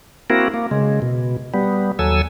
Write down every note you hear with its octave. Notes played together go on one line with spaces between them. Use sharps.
A#3 C4 E4 F#4 A#4
A#3
C#3 G#3
B2
G3 B3
D#2 F#3 A4 G#5 E6